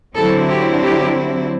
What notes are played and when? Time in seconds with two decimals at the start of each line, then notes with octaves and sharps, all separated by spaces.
0.17 D3 F#3 C4 E4 A4
0.50 G4
0.83 G4